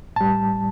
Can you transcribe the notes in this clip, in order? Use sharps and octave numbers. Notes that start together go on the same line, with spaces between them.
A2 G3 A5